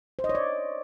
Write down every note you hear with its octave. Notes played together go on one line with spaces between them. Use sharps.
C5
D#5
C#5
D5